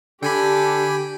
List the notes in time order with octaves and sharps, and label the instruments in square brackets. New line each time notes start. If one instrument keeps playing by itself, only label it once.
[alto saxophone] D3 [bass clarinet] D4 [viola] G4 [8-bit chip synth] G5 G#5 B5